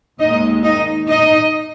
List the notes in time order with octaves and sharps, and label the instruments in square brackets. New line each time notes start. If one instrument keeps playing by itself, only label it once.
[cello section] D#2 D#3 G#3 D#4 D#5
D#4 D#5
D#4 D#5